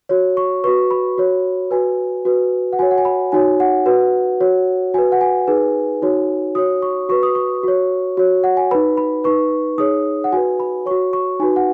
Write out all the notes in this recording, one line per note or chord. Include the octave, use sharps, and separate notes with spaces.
F#4 C#5
C#6
F#4 B4 C#6
B5
F#4 C#5
F#4 B4 G#5
F#4 B4
F#5
F#4 C#5 G#5
F#5
G#5
B5
D#4 F#4 C#5 G#5
F#5
F#4 B4
F#4 C#5
F#4 B4 G#5
F#5
G#5
D#4 G#4 B4
D#4 F#4 C#5
F#4 C#5 D#6
C#6
F#4 B4 C#6
D#6
C#6
F#4 C#5
F#4 C#5
F#5
G#5
D#4 B4 B5
B5
D#4 B4 C#6
D#4 G#4 C#5 D#6
F#5
F#4 B4 G#5
B5
F#4 C#5 C#6
C#6
D#4 F#4 B4 G#5
F#5